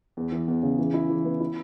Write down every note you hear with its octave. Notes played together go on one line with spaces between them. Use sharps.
E2
E3
E2
C#3
E3
E4
E3
B3
E4